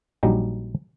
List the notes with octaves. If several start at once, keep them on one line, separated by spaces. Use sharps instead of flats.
A#1 F#3 G3 D#4 D#5